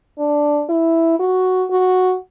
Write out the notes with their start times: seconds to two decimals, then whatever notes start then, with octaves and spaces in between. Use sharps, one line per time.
0.18 D4
0.69 E4
1.19 F#4
1.70 F#4